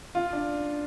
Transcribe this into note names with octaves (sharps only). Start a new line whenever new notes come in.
F4
D4